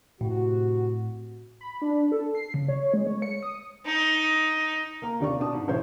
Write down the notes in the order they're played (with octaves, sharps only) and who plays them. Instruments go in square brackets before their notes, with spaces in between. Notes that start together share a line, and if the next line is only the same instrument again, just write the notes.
[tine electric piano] A2 [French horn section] C3 F#4
[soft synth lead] B5
D4
A4
C7
C#3
C#5
G#3
C#5
C#7
D#6
[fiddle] D#4
[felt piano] A#3 A#5
D#2 C3 D4 D5 F5 C#6
B2 D4 A5 D#6
G#2
E1 A1 C5 C#5